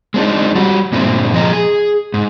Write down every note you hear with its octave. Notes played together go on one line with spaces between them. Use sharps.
G#3 C4 D4 D#4
G3 F#4
G2 A#2 D3 A3 C4
A#2 F3 G#4 D#5 A#5
G#4
G#2